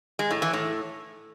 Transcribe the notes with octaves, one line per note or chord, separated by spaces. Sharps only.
G#3
A2
E3
A2